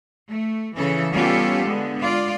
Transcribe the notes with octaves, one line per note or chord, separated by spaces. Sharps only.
A3
C#3 E3 A4
G3 B3 C#4 F4 G4 A4
D3 G#3 B3
G#3 F4 D5